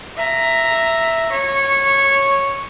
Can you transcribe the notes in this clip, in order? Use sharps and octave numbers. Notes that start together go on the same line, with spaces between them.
E5 A#5
C#5